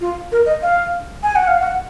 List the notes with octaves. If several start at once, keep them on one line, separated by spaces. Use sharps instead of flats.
F4
A#4
D#5
F5
G#5
F#5
F5
F#5